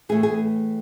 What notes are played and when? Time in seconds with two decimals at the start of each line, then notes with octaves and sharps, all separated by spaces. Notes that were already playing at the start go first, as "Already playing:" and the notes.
0.09 A2 E3 A3 G#4
0.23 G#4